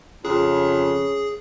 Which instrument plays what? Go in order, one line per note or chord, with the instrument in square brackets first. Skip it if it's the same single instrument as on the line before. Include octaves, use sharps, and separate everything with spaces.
[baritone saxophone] F2 [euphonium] C#3 [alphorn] C#4 [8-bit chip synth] G#4